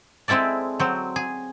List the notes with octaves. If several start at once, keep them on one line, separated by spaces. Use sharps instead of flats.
G#3 C4 E4 A4 D5
F#3 C4
G#4